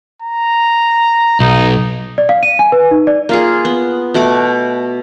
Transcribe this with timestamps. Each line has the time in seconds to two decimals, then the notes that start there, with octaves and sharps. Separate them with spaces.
0.22 A#5
1.40 B1 D#4
2.18 D5
2.29 F5
2.43 D#7
2.59 G#5
2.72 B4
2.91 D#4
3.07 D5
3.29 A#3 F4 G#4
3.65 B3
4.14 B2 A3 F#5 D6